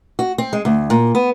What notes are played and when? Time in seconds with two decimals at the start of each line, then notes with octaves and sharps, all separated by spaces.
0.19 F#4
0.38 C4
0.53 G#3
0.65 D2
0.90 A#2
1.15 B3